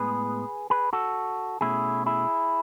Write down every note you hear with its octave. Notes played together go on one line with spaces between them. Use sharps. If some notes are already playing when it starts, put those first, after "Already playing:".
Already playing: A2 G#3 B3 G#4 B4
G#4 B4
F#4 A4
B2 A3 C#4 E4 G#4
E4 G#4